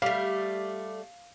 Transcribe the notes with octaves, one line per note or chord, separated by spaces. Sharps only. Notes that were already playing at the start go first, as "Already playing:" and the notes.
G3 A3 F5